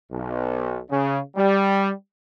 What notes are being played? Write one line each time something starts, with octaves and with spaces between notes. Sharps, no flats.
B1
C#3
G3